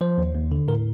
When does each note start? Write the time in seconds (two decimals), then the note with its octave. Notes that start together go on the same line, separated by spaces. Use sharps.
0.01 F3 C5
0.18 D#2
0.35 D#2
0.52 D3
0.68 A2 A#4